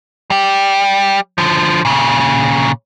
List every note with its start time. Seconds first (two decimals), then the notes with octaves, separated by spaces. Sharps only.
0.30 G3 G4
1.38 D3 F3
1.85 A#2 C#3